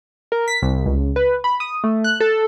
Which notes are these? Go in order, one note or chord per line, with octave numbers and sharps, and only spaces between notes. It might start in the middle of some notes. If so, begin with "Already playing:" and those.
A#4
B6
C2
C#2
B4
B5
D#6
A3
F#6
A4